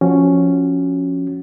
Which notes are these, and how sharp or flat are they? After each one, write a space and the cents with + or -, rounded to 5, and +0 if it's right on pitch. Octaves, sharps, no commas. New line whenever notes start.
F3 +0 C#4 +0 F#4 +0